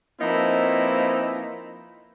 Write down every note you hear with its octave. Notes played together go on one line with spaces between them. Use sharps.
F3 A#3 C4 D#4 E4 B4